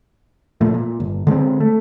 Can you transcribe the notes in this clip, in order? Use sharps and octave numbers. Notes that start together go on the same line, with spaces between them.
A#2 F3 A3
A#2
G1
D3 G#3 A#3 C4
A3